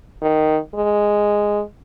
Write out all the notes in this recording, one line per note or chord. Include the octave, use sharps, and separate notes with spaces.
D#3
G#3